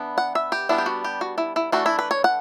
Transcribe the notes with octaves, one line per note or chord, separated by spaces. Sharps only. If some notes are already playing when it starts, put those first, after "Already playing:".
Already playing: E3 B3 D4
F#5
E5
G4
G3 B3 D4 E4
G4
F#4
G4
F#4
E4
E4
E3 A3 D4 F#4
E4
B4
C#5
F#5